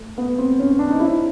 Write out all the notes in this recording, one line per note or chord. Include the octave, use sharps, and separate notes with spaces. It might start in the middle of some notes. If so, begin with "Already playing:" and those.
Already playing: A3
B3
C4
C#4
D4
D#4
E4